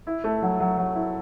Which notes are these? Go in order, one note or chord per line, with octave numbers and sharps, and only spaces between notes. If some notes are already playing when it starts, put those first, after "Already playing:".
E4
A3
F#3
F#3
F#3
E4